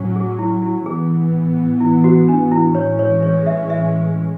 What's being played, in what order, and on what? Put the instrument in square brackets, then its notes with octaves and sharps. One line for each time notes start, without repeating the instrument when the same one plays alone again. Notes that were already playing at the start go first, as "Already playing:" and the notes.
Already playing: [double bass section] A2 F#3 C#4
[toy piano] G#4
E4
E4
[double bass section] A2 E3 B3 [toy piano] G#4
[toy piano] E4
F#4
D4
E4
[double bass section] A2 E3 G#3 C#4 [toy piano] C#5
[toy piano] C#5
C#5
E5
E5